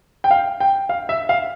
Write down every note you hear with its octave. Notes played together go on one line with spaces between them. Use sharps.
G5
F5
G5
F5
E5
F5